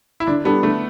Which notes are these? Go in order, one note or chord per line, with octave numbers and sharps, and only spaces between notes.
E4
D3 D4
G3 B3 D4 A4
D3 A3